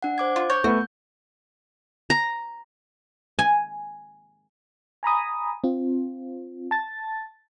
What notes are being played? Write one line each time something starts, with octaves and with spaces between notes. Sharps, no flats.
D4 F#5
C5 D6 G#6
F4
C#5 G6
A3 B3 F#4
A#5
G#5
G#5 A#5 B5 D#6
C4 F4
A5 A6